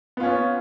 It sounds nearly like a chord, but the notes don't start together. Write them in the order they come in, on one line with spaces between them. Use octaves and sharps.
B3 F4 C#4